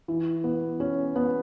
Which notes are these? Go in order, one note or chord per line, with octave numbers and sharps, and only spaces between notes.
E3
B3
C#4
B3